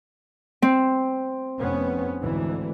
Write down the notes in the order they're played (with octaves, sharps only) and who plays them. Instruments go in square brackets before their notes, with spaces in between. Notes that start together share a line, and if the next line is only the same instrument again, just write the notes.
[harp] C4
[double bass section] F1 B3 C#4
D2 G#2 E3